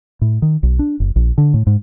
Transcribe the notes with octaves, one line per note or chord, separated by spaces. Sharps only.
A2
D#3
B1
D4
F#1
A#1
D3
A2
G#2